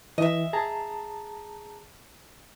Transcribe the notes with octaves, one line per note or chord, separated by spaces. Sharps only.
E3 D#5 E5
G#4 A5 A#5